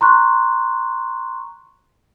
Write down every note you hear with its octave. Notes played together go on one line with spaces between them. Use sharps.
A#5 C6 C#6 F#6